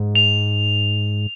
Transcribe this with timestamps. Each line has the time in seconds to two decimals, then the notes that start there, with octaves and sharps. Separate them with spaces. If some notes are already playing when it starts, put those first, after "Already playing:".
Already playing: G#2
0.15 F7